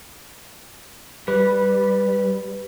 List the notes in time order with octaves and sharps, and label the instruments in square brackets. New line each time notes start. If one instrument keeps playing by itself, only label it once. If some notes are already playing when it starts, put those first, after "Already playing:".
[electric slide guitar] G3 [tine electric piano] B4